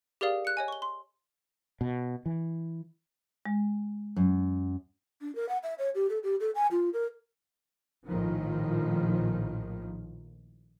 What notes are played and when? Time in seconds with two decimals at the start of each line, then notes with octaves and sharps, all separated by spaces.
0.21 G4 G#4 A#4 D5 F5 D#6
0.45 F#6 C#7
0.57 C#5 D#5 G#5
0.68 C#6 G7
0.82 C6
1.81 B2
2.26 E3
3.46 G#3
4.16 F#2
5.22 D4
5.36 A#4
5.49 F#5
5.63 E5
5.79 C#5
5.95 G4
6.10 A4
6.23 G4
6.40 A4
6.55 G#5
6.71 F4
6.93 A#4
8.08 A#1 A2 D#3 F3